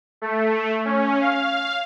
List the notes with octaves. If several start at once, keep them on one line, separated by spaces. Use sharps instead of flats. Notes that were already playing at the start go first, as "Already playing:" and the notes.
A3
C#4
F5